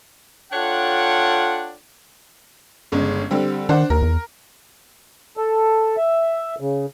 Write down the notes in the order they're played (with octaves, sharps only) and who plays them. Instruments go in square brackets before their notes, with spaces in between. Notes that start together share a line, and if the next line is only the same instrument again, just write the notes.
[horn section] D4 F4 A4 C#5 F#5 G5
[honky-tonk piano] G1 C#3 G#3
D3 G3 C4
[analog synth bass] D#3 [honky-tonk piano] D4 C5 F#5
[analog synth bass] D#2 [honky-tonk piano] A#4
[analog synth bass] E2
[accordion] A4
E5
C#3